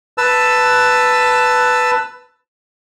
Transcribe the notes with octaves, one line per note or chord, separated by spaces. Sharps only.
B4 A5 E6